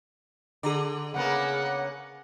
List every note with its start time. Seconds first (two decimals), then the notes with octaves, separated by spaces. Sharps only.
0.63 D3 G#4 A#5 D6
1.14 C#3 A#3 B3 F#5